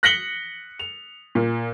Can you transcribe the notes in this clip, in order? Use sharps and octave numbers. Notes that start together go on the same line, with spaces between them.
F#6 A#6 B6 C#7 F#7 G7
F7
A#2